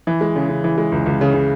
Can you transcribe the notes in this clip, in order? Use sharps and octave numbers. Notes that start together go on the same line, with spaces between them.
E3
G#3
C#3
C#3
E3
G#3
C#2
C#2
C#3
C#3